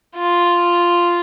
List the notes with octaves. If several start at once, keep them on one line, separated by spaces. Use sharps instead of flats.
F4